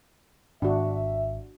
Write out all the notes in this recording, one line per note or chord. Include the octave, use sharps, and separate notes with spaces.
G#1 D4 F#4 E5